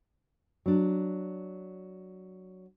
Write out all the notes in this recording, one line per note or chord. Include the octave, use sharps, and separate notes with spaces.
F#3 D4